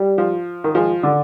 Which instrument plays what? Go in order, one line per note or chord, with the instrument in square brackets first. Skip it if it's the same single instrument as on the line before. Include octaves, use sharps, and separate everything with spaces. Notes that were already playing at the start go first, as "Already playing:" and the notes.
Already playing: [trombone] G3
[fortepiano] F3
D#3
[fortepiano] F3 [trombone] G#3
[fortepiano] D3